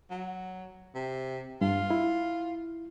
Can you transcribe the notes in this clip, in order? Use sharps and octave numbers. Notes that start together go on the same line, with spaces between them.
F#3
C3
G2 F4
E4